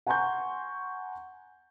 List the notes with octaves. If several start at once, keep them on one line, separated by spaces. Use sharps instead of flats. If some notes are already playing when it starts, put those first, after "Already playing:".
F#5 G#5 A#5 C6 C#6 G6